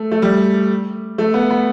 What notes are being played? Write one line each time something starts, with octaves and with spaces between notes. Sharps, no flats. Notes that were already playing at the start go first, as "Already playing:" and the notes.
Already playing: A3
A3
G3
A3
B3
B3